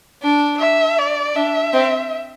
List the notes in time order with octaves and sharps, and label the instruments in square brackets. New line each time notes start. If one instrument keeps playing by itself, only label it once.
[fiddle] D4
[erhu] E5
D5
[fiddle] D4 [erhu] E5
[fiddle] C4